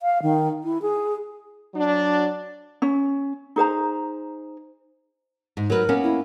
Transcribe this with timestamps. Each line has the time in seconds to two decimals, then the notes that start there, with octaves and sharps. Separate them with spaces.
0.02 F5
0.22 D#3
0.64 E4
0.82 G#4
1.74 F#3 D4
2.82 C#4
3.56 D#4 G#4 C5 A#5
5.57 G#2
5.70 F#3 A#4 B4
5.89 A#3 B3 C#4
6.03 E4